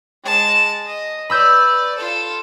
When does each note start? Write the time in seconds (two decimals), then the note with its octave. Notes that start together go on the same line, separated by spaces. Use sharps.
0.24 G#3 A5
0.86 D#5
1.30 B4 D5 B5 E6 G6
1.98 F4 A4